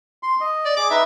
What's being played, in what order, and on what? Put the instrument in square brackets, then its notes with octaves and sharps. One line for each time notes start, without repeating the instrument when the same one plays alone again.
[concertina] C6
D#5
[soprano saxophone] D5
[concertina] G#4 D5 [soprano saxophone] D6
[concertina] D#4 B4 A#5 [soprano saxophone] E5